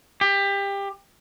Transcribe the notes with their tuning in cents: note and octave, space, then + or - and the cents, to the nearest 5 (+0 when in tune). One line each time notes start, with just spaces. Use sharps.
G4 +20